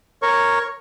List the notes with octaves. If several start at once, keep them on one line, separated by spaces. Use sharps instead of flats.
A#4 C#5 C#6